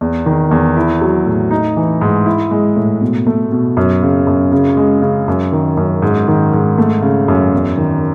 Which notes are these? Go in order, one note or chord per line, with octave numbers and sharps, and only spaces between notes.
E2
D#3
E2
E4
F#3
A2
D#4
E3
G#2
E4
G#3
A2
B2
A3
B2
F#2
C#3
F#2
C#3
G#3
C#3
F#2
D#3
F#2
G#2
D#3
G#2
A3
C#3
F#2
E2
D#3